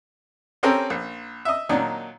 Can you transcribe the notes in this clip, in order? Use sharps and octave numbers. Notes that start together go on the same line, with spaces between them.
C4 C#4 G4 A4 A#4
A#1
D#5 E5
A#2 D#3 F#3 D4 D#4